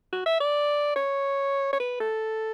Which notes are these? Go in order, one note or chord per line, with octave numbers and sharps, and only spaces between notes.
F#4
E5
D5
C#5
C#5
B4
A4